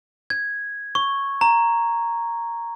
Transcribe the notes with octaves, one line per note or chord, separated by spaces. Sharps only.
G#6
C#6
A#5